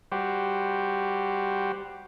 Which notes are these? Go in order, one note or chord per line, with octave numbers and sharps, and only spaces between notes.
G3 F#4 G4 C5